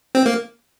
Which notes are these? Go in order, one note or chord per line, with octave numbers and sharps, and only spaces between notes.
C4
A#3